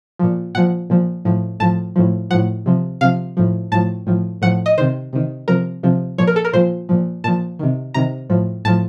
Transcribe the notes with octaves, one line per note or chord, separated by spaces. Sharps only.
A#2 F3
A#2 F3 F#5
A#2 F3
A2 F3
A2 F3 A5
A2 F3
A2 F3 F#5
C3 F3
C3 F3 F5
A2 F3
A2 F3 A5
A2 F3
A2 F3 F#5
D#5
C3 D#3 C5
C3 D#3
C3 F3 A#4
C3 F3
A#2 F3 C#5
A#4
A4
A#4
A#2 F3 C5
A#2 F3
A#2 F3 A5
C3 D#3
C3 D#3 A#5
A2 F3
A2 F3 A5